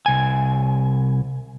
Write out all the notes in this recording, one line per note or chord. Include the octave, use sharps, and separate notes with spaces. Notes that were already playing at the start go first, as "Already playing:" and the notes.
C2 G#5